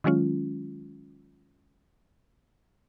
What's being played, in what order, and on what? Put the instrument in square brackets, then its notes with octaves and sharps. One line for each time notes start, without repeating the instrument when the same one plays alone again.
[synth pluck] D#3 F#3 G#3 C#4 F4